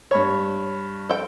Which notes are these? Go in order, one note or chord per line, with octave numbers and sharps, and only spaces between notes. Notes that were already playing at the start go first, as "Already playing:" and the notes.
G2 C#5 B5 C#6
A4 G5